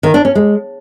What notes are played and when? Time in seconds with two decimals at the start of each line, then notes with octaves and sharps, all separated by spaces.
0.03 D#3
0.14 D4
0.25 C#4
0.35 G#3